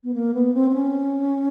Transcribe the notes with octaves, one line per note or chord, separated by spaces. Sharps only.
B3
A#3
B3
C4
C4
C#4